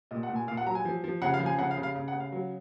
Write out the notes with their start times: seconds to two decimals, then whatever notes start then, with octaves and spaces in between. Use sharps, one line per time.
0.11 A#2 D#5
0.23 F#5
0.29 A#2
0.36 G#5
0.48 A#2 F5
0.57 F#5
0.66 F#3 A#5
0.75 G#5
0.85 F3
1.04 F3
1.22 C#3 F#5
1.34 F5
1.40 F3
1.46 G#5
1.58 C#3 F#5
1.71 F5
1.78 C#3
1.83 F5
1.96 C#3
2.08 F#5
2.14 C#3
2.20 F5
2.32 F#3